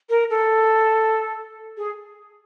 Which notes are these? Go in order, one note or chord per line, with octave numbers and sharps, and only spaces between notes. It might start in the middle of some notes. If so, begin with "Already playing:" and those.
A#4
A4
G#4